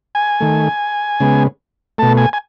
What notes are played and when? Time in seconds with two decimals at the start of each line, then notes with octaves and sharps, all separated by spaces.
0.15 G#5
0.41 D#3 A3
1.20 C#3 G#3 B3
1.98 B2 A3 A5
2.17 G#5
2.33 G#5